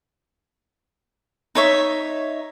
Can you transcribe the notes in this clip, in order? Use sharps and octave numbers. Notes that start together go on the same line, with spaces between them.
D#4 C#5 E5